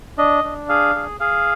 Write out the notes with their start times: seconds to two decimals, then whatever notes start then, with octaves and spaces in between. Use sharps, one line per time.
0.18 D4 D#5
0.44 D4
0.69 G#4 F5
0.95 G#4
1.20 G#4 F5